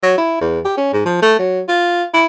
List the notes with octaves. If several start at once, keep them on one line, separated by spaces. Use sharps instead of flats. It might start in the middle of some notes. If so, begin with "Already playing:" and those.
F#3
E4
E2
G4
C#4
G#2
F3
A3
F#3
F4
E4